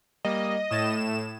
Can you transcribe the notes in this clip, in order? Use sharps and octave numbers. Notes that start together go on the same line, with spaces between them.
G3 A#3 D#5
A2 D#6 G#6 A6 E7